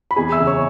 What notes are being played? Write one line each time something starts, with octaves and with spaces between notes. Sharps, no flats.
B5
E2 G#4 G#5
E5 E6
C#3
C#5 C#6